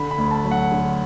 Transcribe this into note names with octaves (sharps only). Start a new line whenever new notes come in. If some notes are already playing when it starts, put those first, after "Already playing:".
Already playing: D3 B5
B5
D2
A5
F#3
F#5
D3